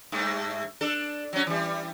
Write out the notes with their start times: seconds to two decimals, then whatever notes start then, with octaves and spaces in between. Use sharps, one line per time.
0.12 G2 A3
0.81 D4 A4
1.33 F#3 C#4
1.47 E3 G3